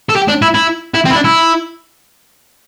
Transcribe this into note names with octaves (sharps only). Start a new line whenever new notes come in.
A4
G4
D4
E4
E4
E4
C4
E4
D4
E4